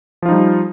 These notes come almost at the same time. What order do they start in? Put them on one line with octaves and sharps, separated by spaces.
F3 F4 D#4 G3